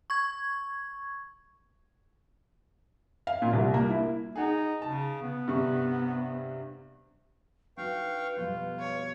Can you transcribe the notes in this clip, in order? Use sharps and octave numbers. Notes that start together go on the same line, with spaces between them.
C#6 G#6
F5
A#2
C2
A#3
E4
D#4 G#4 F#5
C#3 A5
B3
G2 C3 C#6
D4 D#4 F#4 B4 F5 G5 C#6
F2 B2 G3 F4
C#5